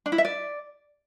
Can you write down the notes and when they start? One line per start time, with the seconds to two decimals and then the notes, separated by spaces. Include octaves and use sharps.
0.06 D4
0.12 E4
0.18 E5
0.25 D5